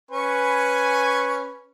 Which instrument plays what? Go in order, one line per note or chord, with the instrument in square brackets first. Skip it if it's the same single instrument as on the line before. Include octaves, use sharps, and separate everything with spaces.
[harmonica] C#4 G#5 C#6 [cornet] B4